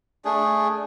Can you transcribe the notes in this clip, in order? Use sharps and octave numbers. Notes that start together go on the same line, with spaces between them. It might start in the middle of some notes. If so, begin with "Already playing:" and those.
A3 D4 G#4